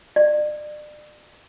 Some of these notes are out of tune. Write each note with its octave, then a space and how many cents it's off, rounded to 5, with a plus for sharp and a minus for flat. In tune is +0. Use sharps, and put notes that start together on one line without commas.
D5 +35